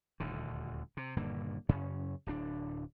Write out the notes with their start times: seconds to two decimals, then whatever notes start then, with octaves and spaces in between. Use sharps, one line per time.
0.20 D#1 D2 D3
0.97 C3
1.16 D#1 G2 D3 A#3
1.69 F#2 C#3 C#4
2.26 D1 D4